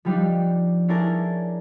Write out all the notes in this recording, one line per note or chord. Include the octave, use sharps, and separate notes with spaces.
F3 G3 D4 D#4
C#4 D4 E4 G#4 A#4 A5